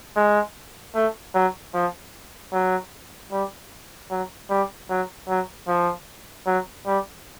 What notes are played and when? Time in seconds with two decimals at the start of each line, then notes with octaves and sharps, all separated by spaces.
0.16 G#3
0.95 A3
1.35 F#3
1.74 F3
2.53 F#3
3.32 G3
4.11 F#3
4.50 G3
4.89 F#3
5.29 F#3
5.68 F3
6.46 F#3
6.86 G3